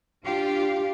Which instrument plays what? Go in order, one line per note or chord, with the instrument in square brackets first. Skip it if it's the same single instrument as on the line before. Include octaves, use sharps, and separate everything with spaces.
[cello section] D4 F4 G4 F5